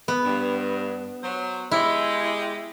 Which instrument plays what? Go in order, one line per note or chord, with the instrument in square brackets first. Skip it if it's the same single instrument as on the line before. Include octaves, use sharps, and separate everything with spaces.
[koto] B3
[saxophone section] G2
F#3 C5
[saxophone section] G#3 G4 [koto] E4